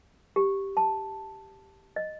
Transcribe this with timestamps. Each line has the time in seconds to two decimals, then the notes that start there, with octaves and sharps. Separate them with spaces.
0.36 G4
0.77 A5
1.96 D#5